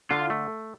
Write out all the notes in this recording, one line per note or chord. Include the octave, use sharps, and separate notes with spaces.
D3 F4
A3